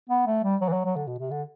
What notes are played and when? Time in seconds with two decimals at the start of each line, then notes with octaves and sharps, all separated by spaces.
0.09 B3
0.26 A3
0.44 G3
0.61 F#3
0.68 E3
0.73 F#3
0.85 F#3
0.96 D3
1.07 B2
1.19 C3
1.31 D3